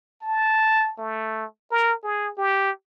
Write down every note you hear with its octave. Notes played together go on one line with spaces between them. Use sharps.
A5
A3
A#4
G#4
G4